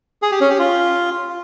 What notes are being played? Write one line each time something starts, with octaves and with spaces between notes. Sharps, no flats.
G#4
G4
C#4
G4
F4